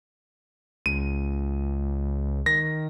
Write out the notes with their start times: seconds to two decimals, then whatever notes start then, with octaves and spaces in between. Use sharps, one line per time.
0.86 C#2 D#7
2.46 D#3 A#6